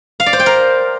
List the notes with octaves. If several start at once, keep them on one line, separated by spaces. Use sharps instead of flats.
F5
D5
C5
G5
A#4